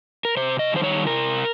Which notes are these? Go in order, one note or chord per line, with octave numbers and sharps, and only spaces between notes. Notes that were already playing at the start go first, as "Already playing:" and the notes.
A#4
C3 C5
D#5
D#3 G3 C5
C#5
C3 A#4